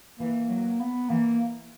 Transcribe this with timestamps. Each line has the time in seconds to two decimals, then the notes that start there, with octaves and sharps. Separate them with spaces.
0.19 E3 A#3
0.49 F#3
0.80 B3
1.09 E3 A#3